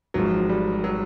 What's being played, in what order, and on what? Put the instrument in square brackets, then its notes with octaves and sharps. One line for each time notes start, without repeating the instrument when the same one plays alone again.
[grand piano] G#1 G#2 F3 G#3 [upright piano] F#3
[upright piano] G3
F#3